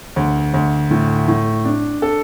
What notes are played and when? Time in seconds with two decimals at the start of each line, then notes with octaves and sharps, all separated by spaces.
0.16 D2
0.54 D2
0.91 A2
1.28 A2
1.65 D4
2.02 A4